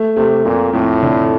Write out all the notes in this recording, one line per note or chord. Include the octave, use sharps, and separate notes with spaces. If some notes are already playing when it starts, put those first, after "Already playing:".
Already playing: A3
C3 A3
F2 A#2
F2 A2
D3